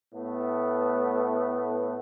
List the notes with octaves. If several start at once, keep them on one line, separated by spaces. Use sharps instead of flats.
A2 A3 B3